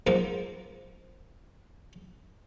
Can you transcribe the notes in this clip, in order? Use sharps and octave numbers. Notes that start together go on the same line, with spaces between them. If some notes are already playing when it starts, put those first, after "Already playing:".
G#2 F3 A#3